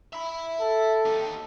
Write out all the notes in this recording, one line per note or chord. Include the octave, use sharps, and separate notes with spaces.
E5 B5
A4
A#3 G4